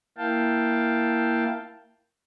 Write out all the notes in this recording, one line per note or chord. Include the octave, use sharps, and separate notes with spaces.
A#3 E4 F5 G5 A5